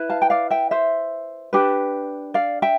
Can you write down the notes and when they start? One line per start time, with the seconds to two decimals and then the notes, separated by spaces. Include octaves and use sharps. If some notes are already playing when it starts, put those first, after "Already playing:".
Already playing: E4 B4
0.10 F5 A5
0.22 G5
0.30 D5 F5
0.50 E5 G5
0.71 C5 E5
1.53 D4 G4 B4
2.34 D5 F5
2.62 E5 G5